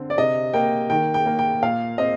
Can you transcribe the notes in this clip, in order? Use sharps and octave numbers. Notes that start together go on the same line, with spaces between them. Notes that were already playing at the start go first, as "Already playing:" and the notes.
Already playing: D3 C4
D5
C3 D#5
A#3 G5
D#3 G5
G5
A#3
G5
A#2 F5
C4 D#5